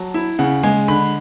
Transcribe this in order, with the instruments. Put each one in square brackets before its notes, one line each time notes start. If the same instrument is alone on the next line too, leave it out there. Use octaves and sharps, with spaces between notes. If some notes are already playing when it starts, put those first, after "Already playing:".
Already playing: [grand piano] F#3 A5
E4
C#3 F#5
G#3 G#5
D3 B5